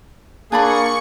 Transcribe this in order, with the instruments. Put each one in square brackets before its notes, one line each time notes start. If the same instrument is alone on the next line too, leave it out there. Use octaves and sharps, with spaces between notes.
[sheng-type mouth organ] A#3 [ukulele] D4 D5 B5 [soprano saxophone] G#4 [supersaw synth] C#6 C#7